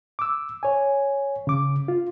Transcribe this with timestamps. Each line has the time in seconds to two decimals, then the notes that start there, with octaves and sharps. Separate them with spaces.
0.19 D6 E6
0.63 C#5 G#5
1.47 C#3 D6
1.88 F4